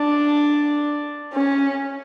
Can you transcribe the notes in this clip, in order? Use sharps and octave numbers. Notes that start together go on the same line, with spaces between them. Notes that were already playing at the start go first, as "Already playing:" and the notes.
Already playing: D4
C#4